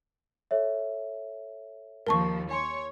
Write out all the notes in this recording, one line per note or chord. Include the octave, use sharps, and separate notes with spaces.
A4 C#5 E5
D#2 F3 A#4 A5 C#6
C#5 G#5 C6 C#7